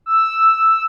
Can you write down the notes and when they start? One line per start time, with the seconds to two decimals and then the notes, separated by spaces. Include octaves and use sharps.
0.06 E6